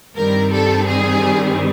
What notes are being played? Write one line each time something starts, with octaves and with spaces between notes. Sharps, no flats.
G2 D#3 G3 C4 A#4
A4
G#4